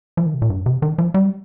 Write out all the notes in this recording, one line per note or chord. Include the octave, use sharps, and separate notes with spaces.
F3
D#3
C3
A#2
G2
C3
D#3
F3
G3